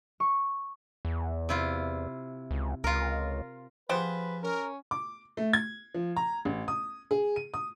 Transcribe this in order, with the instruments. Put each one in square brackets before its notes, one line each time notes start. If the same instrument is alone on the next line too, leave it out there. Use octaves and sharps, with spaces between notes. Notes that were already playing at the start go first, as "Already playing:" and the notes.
[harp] C#6
[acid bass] E2
[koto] C3 E4 F4
[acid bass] C#2
[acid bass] C#2 [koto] F4 A#4
[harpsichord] F3 F4 G#4 [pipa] B3 G4 C5 [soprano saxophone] B4
[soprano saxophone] C#4 [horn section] A#4
[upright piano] D6
A3
G#6
F3
A#5
A1
D#6
G#4
D#7
D#6